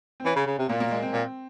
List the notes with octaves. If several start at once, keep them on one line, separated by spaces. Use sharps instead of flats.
C4
E3 C#4
C#3
C#3
C3
A#2 A#3
A#3
G#3
C4
A#2